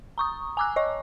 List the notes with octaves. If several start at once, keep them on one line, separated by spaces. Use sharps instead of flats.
A#5 C#6 D#6
G#5 A#5 D6 E6 F#6
C#5 D#5 C#6